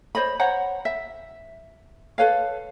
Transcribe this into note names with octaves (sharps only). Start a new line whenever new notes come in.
C5 C#5 D#5 B5
C5 C#5 F#5 A#5
E5
A4 B4 C#5 F5